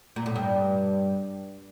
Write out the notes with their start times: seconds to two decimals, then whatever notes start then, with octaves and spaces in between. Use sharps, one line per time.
0.16 A#2
0.26 A2
0.36 G2